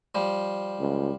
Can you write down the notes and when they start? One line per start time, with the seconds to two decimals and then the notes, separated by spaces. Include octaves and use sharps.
0.15 F3 G3
0.80 C#2